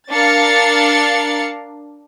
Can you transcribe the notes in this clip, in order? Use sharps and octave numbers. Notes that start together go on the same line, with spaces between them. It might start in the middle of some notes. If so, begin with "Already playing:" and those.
D4 A#4 F5 A6 C#7